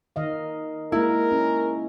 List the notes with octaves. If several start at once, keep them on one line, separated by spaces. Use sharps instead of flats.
D#3 D#5 F5
G#3 A#3 E4 A#4
C#4